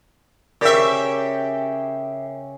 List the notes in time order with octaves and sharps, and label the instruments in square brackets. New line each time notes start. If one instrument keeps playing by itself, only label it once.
[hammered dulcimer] C#3 [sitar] G4 E5 [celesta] A#4 D5